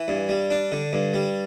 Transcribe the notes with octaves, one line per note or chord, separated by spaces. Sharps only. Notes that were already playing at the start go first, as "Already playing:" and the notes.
Already playing: E3
G2
G3
D4
D3
G2
G3